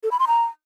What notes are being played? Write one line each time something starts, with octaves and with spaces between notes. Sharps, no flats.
A4
B5
C6
A#5